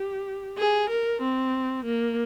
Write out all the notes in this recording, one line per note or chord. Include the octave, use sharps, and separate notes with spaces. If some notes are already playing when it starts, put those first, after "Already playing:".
Already playing: G4
G#4
A#4
C4
A#3